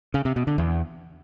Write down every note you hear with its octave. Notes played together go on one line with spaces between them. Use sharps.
C#3
C3
B2
D3
E2